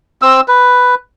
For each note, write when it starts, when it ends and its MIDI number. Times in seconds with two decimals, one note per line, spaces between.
0.22 0.41 60
0.22 0.41 88
0.48 0.95 71